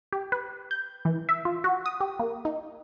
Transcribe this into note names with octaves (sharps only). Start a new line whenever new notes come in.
G4
B4
G6
E3
E5
F4
F#4
D#6
G4
A#3
D#4